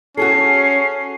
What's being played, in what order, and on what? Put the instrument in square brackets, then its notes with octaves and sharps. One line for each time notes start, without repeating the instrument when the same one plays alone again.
[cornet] C#4 [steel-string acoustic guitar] F#4 G#4 A4 [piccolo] C7